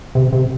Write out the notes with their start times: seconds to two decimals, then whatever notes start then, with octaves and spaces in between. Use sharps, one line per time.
0.15 C3
0.33 C3